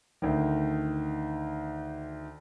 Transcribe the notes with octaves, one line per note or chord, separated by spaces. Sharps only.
D2 D#3